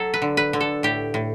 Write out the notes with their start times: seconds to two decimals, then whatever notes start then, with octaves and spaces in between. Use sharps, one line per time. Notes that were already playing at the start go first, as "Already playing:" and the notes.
Already playing: F#3 A4
0.14 B4
0.22 D3
0.37 B4
0.53 D3
0.60 A4
0.83 A2 G4
1.14 A2